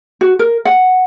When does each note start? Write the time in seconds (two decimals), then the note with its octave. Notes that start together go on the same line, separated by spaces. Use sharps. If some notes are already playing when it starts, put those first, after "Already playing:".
0.21 F#4
0.39 A#4
0.65 F#5